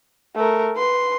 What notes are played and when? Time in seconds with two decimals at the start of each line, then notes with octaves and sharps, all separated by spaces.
0.35 A3 A#4
0.76 B4 C6